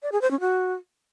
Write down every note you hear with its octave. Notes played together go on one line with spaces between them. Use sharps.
D5
G#4
C5
C#4
F#4